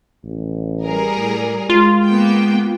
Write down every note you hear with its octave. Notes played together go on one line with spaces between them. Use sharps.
A1
G3 G#4 A#4
A2
G#3 F4
A#3 B3 G5